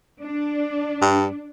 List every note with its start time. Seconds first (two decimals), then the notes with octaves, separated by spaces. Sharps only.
0.22 D4
1.02 G2